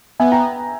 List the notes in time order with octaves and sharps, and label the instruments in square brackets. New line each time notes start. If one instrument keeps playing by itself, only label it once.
[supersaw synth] B3 [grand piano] E5 G#5
[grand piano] G5 A#5